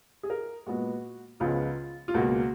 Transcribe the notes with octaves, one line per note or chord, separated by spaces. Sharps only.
G#4
A#4
A#2 G#3 B3 F#4
C#2 C#3 F3 G#3 B3 F4
F4
C#2 B2 A#3 F#4